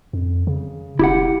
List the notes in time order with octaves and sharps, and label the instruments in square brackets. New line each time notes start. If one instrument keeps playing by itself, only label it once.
[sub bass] F2
C#3
[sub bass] E1 [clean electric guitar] E4 G4 F#5